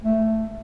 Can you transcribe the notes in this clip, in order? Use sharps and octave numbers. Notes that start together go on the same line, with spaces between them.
A3